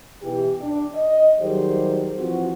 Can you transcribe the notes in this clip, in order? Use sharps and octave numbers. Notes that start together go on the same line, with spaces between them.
B2 E3 G4
D4
D#5
D#3 F#3 G3 G4 G#4 C5
E3 F3 C4 F#4